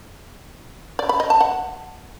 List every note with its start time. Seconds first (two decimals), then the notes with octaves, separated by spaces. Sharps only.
0.99 D5
1.09 B5
1.20 D#5
1.30 A5
1.41 F#5